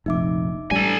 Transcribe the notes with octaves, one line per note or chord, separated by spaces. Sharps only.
F1 A#1 D#4 E5 D6
A1 G3 D4 A4 G#5